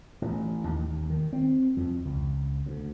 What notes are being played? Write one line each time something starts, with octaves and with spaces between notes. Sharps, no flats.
A1
D#2
D#3
C4
F2
C#2
D2